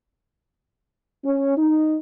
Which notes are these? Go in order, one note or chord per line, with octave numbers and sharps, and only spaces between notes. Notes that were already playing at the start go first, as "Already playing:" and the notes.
C#4
D#4